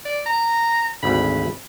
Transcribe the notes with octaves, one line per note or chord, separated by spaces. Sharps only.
D5
A#5
G#1 D2 B5